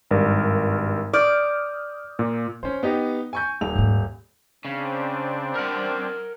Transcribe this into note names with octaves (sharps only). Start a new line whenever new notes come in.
G#1 G2 A#4
D5 D#6 F6 G6
A#2
D#3 C#4 C5
B3 D#4 G4
G#5 C#6 G6
D#1 F7
G#2 A#3
C#3 C4 D4
A#4 F#5